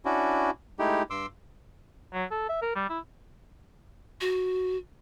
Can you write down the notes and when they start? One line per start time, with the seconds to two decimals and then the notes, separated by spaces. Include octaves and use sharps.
0.05 C#4 D4 E4 F#4
0.79 G#3 A3 D#4 E4 G4
1.10 G2 C6 D6 E6
2.13 F#3
2.31 A4
2.49 E5
2.62 A#4
2.75 G3
2.89 E4
4.21 F#4